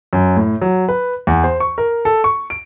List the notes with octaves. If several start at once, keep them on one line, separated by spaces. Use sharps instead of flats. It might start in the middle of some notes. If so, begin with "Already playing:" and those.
F#2
A2
F#3
B4
E2
C5
C#6
A#4
A4
C#6
D7